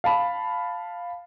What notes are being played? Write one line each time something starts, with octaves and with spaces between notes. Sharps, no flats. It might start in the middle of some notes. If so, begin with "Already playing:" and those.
F5 A5 B5